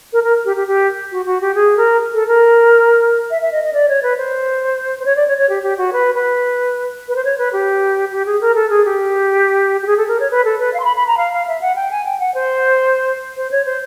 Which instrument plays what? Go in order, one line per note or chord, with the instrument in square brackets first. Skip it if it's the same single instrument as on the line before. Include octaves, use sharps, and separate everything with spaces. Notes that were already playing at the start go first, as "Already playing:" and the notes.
[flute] A#4
A#4
G4
G4
G4
F#4
F#4
G4
G#4
A#4
A4
A#4
E5
E5
D#5
D#5
D5
C#5
B4
C5
C5
C#5
D5
C#5
C#5
G4
G4
F#4
B4
B4
B4
C5
C#5
B4
G4
G4
G#4
A#4
A4
G#4
G4
G4
G#4
A4
A#4
C#5
B4
A4
B4
F5
C6
B5
B5
A#5
F5
F5
E5
F#5
G5
G#5
G5
F#5
C5
C5
C#5
C5